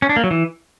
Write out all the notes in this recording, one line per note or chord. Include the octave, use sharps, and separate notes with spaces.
C#4
D4
A#3
F#3
E3